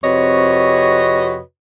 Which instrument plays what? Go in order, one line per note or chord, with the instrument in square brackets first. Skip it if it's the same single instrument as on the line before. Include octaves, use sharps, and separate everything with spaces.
[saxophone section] F2 C3 F#4 B4 C#5 D#5